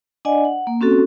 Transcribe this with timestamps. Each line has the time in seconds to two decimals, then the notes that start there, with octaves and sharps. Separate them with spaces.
0.25 D4 D5 D#5 F#5 G#5
0.45 F#5
0.67 A#3
0.81 C4 C#4 F#4 A4